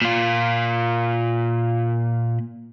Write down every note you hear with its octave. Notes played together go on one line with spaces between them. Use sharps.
A#2 F4